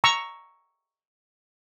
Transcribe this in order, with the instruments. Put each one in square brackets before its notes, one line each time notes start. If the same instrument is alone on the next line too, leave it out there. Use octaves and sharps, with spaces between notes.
[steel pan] A#5 C#6 E6